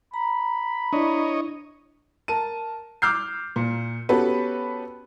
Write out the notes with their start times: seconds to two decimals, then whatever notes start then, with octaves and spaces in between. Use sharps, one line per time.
0.14 A#5 B5
0.93 D4 E4 C#5 D#5
2.28 A#4 A5 D#7
3.02 D6 E6 F6 G6 C7
3.56 A#2
4.09 B3 C#4 F#4 G4 A4 B4